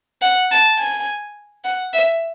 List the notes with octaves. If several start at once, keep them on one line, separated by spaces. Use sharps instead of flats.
F#5
A5
G#5
F#5
E5